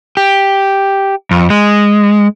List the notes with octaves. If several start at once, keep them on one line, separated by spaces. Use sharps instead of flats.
G4
F2
G#3